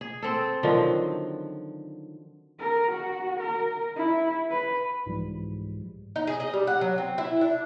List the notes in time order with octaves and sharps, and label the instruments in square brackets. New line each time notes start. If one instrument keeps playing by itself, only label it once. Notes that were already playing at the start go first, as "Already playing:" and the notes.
[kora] G#4
C4 A4
D3 D#3 F3 F#3
[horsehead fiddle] A#4
F#4
A#4
E4
B4
[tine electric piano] C2 G#2 E3 F3 G3 G#3
[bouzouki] D#4
G#4
D#5
G3
F#5
F#3
C4
E4
D4